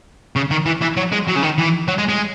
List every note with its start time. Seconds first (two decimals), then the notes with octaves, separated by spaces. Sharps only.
0.36 C#3
0.51 D#3
0.66 E3
0.82 E3
0.97 F#3
1.12 G#3
1.27 F#3
1.35 C#3
1.42 D#3
1.58 E3
1.88 F#3
1.98 G#3
2.09 G#3